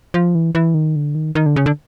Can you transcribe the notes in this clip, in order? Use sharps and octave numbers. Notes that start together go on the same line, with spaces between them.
F3
E3
E3
D#3
D3
D#3
D#3
D3
C#3
D3